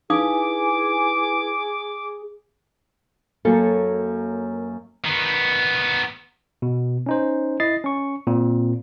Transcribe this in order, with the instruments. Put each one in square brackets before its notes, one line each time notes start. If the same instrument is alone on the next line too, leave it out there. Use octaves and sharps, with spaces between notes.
[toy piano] D#4 F5 D#6 [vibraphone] E4 B4 G#5 [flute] G#4 [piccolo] D6
[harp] F#2 A#3 C#5 [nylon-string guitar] A4
[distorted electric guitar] D#3 B3
[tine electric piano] B2
C#4 D#4 C5
E4 D#5 A6 C7
C#4 C#6
A#2 C4